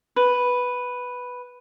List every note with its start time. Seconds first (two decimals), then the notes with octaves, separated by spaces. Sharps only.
0.16 B4